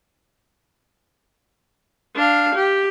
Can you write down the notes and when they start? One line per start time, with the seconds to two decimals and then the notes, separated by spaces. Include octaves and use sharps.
2.15 D4 F5
2.55 G4